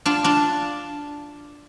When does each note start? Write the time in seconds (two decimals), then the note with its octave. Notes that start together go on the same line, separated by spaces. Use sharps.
0.06 D4 F4
0.24 D4 F4